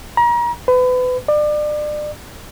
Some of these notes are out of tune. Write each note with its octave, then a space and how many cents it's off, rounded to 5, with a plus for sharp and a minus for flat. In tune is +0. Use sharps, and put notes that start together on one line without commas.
A#5 +35
B4 +30
D5 +30